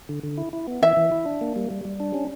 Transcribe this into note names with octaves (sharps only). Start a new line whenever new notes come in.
D3
D3
E4
E4
B3
E3 E5
E3
E4
D4
A#3
G3
G3
G3
D4
C#4